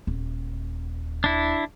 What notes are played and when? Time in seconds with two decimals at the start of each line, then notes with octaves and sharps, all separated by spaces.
0.07 D#1
1.24 D4 E4